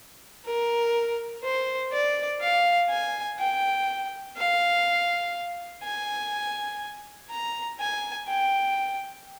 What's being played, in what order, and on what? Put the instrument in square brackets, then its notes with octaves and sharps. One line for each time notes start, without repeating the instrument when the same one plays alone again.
[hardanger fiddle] A#4
C5
D5
F5
G#5
G5
F5
G#5
A#5
G#5
G5